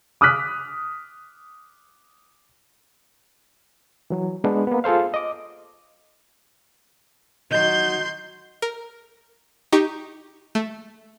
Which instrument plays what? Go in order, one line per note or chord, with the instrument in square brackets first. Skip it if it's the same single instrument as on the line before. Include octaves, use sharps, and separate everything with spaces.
[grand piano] D6 D#6 F6 F#6 B6
[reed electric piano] E3 F#3
G#3 B3 D4
A#3 B3
F4 G#4 A4 C5 F5
D#5 D6
[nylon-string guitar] D#3 F#3 [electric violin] C6 G6
[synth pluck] A#4
D#4 G4 C#6
A3